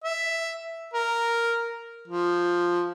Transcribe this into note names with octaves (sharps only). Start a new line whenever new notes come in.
E5
A#4
F3